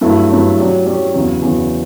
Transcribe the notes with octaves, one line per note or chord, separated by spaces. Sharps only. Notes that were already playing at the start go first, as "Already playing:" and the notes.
G2 F#3 A3 E4
G2 F#3 A3 E4
F#3 C#4 G4 D5
F#3 C#4 G4 D5
E2 C#3 F#3
E2 C#3 F#3